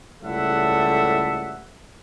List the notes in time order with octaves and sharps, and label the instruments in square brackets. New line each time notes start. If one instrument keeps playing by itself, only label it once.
[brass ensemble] C#2 A2 G3 A4 E5 F#5